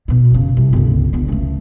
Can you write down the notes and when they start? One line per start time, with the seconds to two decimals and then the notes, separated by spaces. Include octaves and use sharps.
0.08 B2 D#3
0.30 F#2 C#3
0.57 C2
0.73 G1 C#2
1.13 D3 B3
1.28 C#2 A3